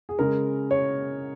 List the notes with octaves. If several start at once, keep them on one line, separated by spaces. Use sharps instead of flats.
G#4
C#3 G#3 A#4
C#5